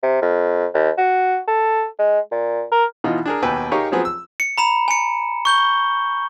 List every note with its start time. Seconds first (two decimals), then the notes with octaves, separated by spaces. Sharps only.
0.03 C3
0.22 F2
0.74 D#2
0.98 F#4
1.48 A4
1.99 G#3
2.32 A#2
2.72 A#4
3.04 B2 E3 D#4 F4
3.26 D4 G#4 A#4
3.43 D#2 B2 B4 G5 G#5 E6
3.72 D#4 G4 G#4 A#4 C#5 F5
3.92 F3 F#3 B3 C4 G#4
4.05 E6
4.40 C#7
4.58 A#5 B5 E7
4.88 G#5 C#7
5.45 C#6 G6 G7